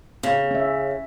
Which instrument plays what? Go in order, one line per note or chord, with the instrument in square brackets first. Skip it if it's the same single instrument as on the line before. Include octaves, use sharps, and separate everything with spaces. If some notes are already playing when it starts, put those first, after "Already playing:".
[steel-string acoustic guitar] C#3
[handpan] C#4 E5